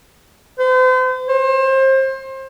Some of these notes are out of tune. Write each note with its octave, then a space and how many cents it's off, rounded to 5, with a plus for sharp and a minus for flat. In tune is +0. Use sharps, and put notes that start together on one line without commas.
C5 -40
C5 +30